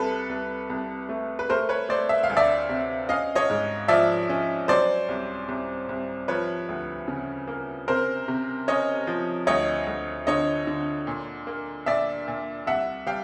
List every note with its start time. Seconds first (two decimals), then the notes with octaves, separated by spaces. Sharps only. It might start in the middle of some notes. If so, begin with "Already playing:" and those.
Already playing: C2 A4 B4
0.29 C2
0.70 C2
1.09 A3
1.39 B4
1.49 A3 A#4 C5
1.69 B4 C#5
1.89 A3 C5 D5
2.09 E5
2.23 F5
2.30 D2
2.37 D5 E5
2.69 C3
3.09 C#4 D#5 F5
3.35 C#5 D#5
3.50 G#2
3.88 F3 D5 E5
4.30 C#4
4.68 F#3 C5 D5
5.09 C2
5.48 C2
5.89 C2
6.28 F3 B4 C#5
6.69 D2
7.08 C#3
7.48 A#3
7.88 C3 A#4 C5
8.28 C3
8.68 C#4 C#5 D#5
9.07 F3
9.47 D2 C#5 D#5
9.87 D2
10.27 D3 C#5 D#5
10.67 D3
11.07 A#2
11.47 A#3
11.86 A#2 D5 E5
12.27 A#2
12.66 C2 E5 F#5
13.06 G3 F5 G5